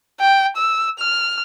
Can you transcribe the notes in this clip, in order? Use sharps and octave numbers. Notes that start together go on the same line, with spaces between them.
G5
E6
F6